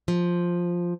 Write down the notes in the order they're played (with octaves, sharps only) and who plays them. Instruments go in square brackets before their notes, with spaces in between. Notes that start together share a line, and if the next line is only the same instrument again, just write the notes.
[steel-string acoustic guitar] F3